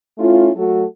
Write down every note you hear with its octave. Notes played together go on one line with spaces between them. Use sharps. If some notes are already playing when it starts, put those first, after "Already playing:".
A3 C#4 E4 F4
F#3 A3 F#4 A4